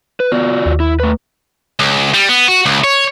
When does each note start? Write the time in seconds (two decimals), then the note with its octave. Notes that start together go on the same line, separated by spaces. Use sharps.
0.20 B4
0.32 B3 F4 F#4 D5
0.66 D#2
0.80 E4
1.00 A3 B4
1.80 C#2
2.14 G3
2.29 B3
2.48 F#4
2.66 C#2
2.84 C#5